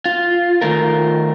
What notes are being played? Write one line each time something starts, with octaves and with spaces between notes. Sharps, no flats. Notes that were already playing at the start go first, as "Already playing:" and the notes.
F4
D#3 A3 F4 A#4